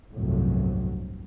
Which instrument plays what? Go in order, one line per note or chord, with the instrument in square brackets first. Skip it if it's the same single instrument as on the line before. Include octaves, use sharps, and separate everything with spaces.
[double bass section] G1 C2 F2 A2 C3 F#3